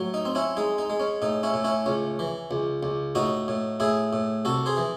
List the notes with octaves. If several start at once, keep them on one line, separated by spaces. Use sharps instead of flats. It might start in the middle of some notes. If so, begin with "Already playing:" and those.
Already playing: A2 F#3
D#4
C4
C#4 E4
G#3 D#4
D#4
G#3
C#4
A2 D#4
C#4 E4
A2
C#4 E4
C#2 C#4
E3
C#2
C#2
A2 D#4 F#4
A2
A2 E4 G#4
A2
C2 F#4 A4
G#4 C5
E3